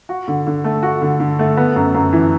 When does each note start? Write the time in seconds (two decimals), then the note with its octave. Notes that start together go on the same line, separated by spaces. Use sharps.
0.09 F#4
0.28 D3
0.47 D3
0.64 A3
0.83 F#4
1.02 D3
1.20 D3
1.39 A3
1.57 B3
1.76 F#2
1.95 F#2
2.13 E3